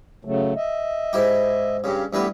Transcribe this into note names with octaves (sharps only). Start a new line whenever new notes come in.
C#3 F#3 A3
D#5 E5
G#2 E4 G4
G2 C#3 G4
G2 E3 A3 B3 G4 B4